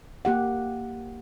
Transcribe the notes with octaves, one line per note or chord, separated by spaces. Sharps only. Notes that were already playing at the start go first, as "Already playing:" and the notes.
A#3 G4 F#5